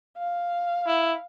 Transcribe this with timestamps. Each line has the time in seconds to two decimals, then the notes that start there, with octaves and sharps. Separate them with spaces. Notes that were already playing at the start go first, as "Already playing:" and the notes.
0.17 F5
0.86 E4